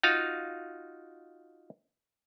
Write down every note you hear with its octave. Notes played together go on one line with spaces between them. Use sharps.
D#4 F4 F#4 F5